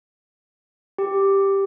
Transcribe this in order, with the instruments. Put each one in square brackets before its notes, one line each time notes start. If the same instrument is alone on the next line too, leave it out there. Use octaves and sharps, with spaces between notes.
[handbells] G4